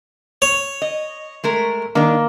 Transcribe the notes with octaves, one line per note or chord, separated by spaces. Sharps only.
C#5
D#5
G#3 A3 A#4
D#3 A#3 D4